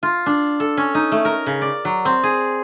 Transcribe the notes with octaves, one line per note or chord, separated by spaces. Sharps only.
F4
D4
A4
C#4
D#4
A3
A#4
C#3
D5
F#3
C4
G#4